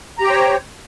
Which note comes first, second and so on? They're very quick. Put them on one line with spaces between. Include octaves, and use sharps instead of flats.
A#5 G4 G5 C5 C#5